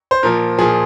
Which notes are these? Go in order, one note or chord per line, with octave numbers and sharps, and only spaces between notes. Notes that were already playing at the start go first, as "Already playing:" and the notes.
C5
A#2 F3 A#4
A#2 F3 G#4